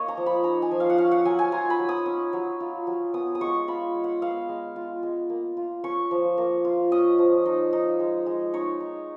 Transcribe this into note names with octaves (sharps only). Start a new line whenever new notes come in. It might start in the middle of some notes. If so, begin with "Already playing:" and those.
Already playing: A#3 D#4 C#5 D#5
A#5
F3
B5
D#4 A#5
G#5
F3
F5
F#5
C#4 F5
F#5
F#3 G#5
G#5
F4 A#5
B5
F#3
D#6
C#4
F#3
F4
F#3
B3 D#6
D#6
G#3 C#6
F4 B5
G#3
F#5
B3 F5
G#3
F4
G#3
A#3
F4
C#4 C#6
F3
A#3
F4
C#4 D#5
F3
D#4
D#4
G#3
G#3
D#4 C#5
D#4